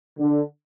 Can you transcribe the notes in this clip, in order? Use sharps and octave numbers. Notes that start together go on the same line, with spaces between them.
D3